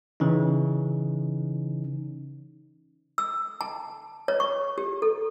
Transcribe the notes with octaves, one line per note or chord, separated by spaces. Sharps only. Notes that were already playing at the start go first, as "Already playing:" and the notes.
C#3 E3 C#4 D#4
E6
A5
C#5
C#6
G4
A4